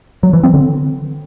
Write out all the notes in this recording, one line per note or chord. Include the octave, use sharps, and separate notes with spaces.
F#3
E3
C4
D3